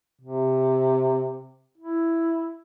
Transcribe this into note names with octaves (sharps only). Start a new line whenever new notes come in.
C3
E4